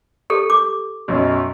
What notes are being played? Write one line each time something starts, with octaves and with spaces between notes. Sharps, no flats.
G4 A4
D6
B1 F#2